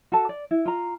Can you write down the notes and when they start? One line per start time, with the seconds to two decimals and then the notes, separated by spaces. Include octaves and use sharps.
0.12 F#4 A4 A5
0.29 D5
0.51 E4
0.66 F4 A#5